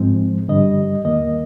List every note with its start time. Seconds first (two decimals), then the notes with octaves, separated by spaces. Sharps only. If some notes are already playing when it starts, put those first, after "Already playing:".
Already playing: G#2 F3 G#3 C4
0.48 G2 D3 G3 D#5
1.05 D#2 D#3 A#3 D#5